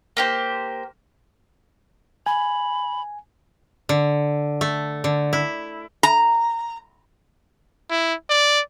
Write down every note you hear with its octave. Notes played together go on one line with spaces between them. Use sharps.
A#3 G4 C5
G#5 B5
D3
A3
D3
E4
A#5
E4
D5